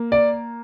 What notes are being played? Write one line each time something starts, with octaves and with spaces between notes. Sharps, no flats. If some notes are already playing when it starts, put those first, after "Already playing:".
Already playing: A#3
D5